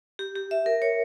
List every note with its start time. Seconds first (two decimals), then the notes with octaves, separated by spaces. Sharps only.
0.19 G4
0.35 G4
0.51 E5
0.66 A#4
0.82 C#5